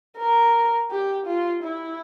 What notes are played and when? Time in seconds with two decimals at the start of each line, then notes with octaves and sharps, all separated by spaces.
0.18 A#4
0.91 G4
1.27 F4
1.63 E4